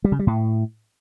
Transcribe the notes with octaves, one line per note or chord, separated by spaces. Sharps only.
G3
C#3
G3
A2